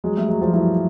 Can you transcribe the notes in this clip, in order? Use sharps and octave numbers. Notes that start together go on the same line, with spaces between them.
F#3 G#3
G3 A3
F#3 G#3
F3 G3
E3 F#3